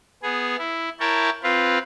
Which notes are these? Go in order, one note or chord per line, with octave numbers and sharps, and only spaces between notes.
B3 G#4
E4
E4 A#4 C#5 G5 A5
C4 F4 B4 F5